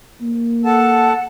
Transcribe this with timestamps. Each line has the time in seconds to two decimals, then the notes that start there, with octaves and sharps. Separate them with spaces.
0.21 A#3
0.65 A4 F#5 A5